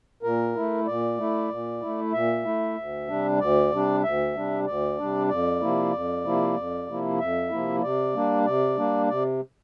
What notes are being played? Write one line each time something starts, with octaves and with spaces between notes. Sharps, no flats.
A#2 A#4
A3 E4
A#2 D5
A3 E4
A#2
A3 E4
A#2 E5
A3 E4
D2
C3 G3 D4
D2 D5
C3 G3 D4
D2 E5
C3 G3 D4
D2 D5
C3 G3 D4
F2 D5
C3 F3 A#3 E4
F2
C3 F3 A#3 E4
F2
C3 F3 A#3 E4
F2 E5
C3 F3 A#3 E4
C3 D5
G3 A#3 D4
C3 D5
G3 A#3 D4
C3 D5